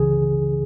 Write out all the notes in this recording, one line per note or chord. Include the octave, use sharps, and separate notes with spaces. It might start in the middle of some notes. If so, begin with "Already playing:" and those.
Already playing: C#2 C#3 E3 G#4